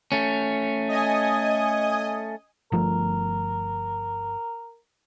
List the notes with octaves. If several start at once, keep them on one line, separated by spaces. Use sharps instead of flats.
A3 C#4
D#5 G#5 D#6
G1 F3 A3 A#4